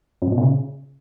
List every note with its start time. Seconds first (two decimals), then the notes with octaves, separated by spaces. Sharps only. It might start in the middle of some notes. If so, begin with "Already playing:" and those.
0.22 F#2
0.27 G#2
0.32 B2
0.38 A#2
0.43 C#3